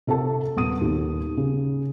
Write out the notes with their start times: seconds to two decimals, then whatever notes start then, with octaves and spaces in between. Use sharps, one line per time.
0.07 C3 A4 A#4 A5
0.56 D#1 B3 D#6 D#7
0.81 D#2
1.37 C#3